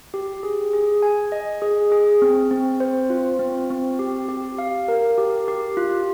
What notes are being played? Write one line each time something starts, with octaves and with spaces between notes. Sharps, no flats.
G4
G#4
G#4
G#5
D#5
G#4
G#4
C4
C4
C5
F4
C4
C4
G4
G4
F5
A#4
G4
G4
F4